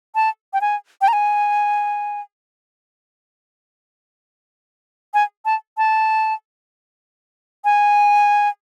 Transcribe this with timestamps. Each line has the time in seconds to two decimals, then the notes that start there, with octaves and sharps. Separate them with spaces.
0.15 A5
0.53 G5
0.61 G#5
1.01 G5
1.08 A#5
1.13 G#5
5.14 G#5
5.45 A5
5.78 A5
7.65 G#5